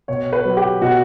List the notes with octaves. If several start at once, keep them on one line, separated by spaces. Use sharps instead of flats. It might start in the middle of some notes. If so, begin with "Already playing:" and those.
B2 C#5
B4
F#3
G4
B2 F#4